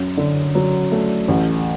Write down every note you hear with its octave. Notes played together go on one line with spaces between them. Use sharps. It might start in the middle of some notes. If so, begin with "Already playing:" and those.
Already playing: F#2
D3
F#3
A3
A1